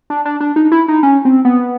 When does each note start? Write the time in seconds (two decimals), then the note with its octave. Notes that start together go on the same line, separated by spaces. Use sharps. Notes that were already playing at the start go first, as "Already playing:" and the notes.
0.10 D4
0.25 D4
0.40 D4
0.56 D#4
0.72 E4
0.88 D#4
1.03 C#4
1.25 C4
1.45 B3